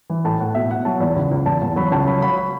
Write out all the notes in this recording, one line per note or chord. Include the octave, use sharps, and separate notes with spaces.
E3
A2 A5
A2 F#5
B2 E5
B2 F#5
F#3 A5
E2
C#2
C#2
E2 A5
E2
F#3 B5
C#2 A5
F#3 B5
F#3 B5
B5